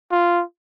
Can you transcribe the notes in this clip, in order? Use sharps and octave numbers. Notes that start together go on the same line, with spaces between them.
F4